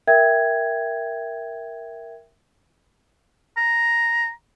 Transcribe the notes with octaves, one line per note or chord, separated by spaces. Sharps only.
A#4 E5 G5 G#6
A#5